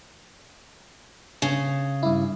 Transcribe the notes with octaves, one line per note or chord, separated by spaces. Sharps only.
C#3
G2 E4